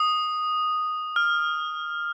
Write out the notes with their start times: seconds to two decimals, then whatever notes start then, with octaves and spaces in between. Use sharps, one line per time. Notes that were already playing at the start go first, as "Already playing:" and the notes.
Already playing: D#6
1.16 F6